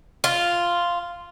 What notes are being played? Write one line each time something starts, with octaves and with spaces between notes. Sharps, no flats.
F4